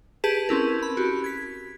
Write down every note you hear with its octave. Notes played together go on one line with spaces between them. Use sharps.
G4 G#4 B4 A5 B6 E7
C4 C#4 E4 A#4
B5
F#4 G4
G#6 B6